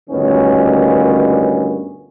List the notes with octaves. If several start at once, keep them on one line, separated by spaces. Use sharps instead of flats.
D2 G2 A#2 D#3 B3 C#4